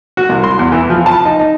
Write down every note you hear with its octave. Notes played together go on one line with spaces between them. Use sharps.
F#4
C2
C6
E2
E3
F3
A5
D#4
D#4